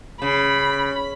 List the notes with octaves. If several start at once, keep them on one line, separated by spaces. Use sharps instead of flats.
C#3 B5